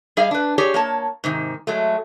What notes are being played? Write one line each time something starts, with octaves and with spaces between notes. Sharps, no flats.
G3 G#4 D#5 F5
D4 B4
G4 G#4 C#5 D5
A#3 C#5 A5
G#2 C3 D#3
F#3 G#3 A3